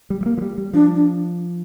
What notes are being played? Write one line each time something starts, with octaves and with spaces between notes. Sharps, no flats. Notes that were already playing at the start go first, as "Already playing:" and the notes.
G3
G3
A#3
F3
G3
G3
F3 D4
D4